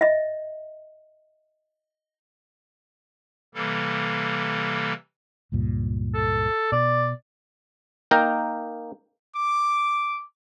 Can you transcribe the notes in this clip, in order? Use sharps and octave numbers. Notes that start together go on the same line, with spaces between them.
D#5 E5
C3 E3 G3 A#3 A4
C#2 G2 A#2
A4
B2 D5
A#3 D#4 A#4 G5 A#5
D6